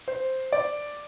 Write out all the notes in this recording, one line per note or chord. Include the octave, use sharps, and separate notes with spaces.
C5
D5